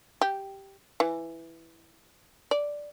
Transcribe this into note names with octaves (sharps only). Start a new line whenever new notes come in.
G4
E3
D5